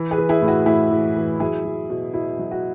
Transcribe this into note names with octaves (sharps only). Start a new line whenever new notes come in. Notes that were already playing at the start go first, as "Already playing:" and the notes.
Already playing: E3
G#4 B4
E3
E4 G#4
A2 E4
F#4
A2 E4 G#4
E3
E3
F#3 E4 G#4
F#3
B2
B2 E4
F#3
F#4